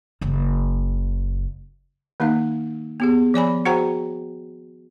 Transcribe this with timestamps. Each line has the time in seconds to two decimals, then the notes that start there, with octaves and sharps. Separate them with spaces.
0.21 F#1 C#3
2.20 D#3 A#3 D#4 F5
3.00 B3 G4 G#4
3.34 F3 D5 G#5 B5
3.65 F#4 G#4 C5 F#5 G5 A#5